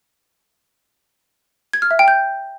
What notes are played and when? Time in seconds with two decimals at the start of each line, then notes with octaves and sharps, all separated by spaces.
1.73 G#6
1.82 F6
1.91 E5
1.99 G5
2.08 G6